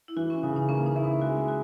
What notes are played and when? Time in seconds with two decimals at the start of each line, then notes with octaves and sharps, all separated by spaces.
0.08 E4
0.16 E3 F#4
0.30 C#4
0.43 C#3 D#4
0.56 D#4
0.69 A#3 C#4
0.86 D#4
0.96 C#4 E4
1.04 D#4
1.21 G#3 F#4
1.48 F#4